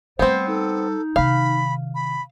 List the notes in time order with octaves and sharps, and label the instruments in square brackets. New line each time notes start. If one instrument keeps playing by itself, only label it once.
[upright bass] G3 A3 [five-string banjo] B3 C4 [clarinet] C5
[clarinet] D#4 [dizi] A4
[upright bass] C3 D#3 [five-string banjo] F5 [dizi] B5
[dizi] B5